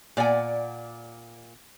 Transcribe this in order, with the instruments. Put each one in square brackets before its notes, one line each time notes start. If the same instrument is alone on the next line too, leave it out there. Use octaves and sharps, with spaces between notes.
[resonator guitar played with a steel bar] A#2 D5 F#5 G#5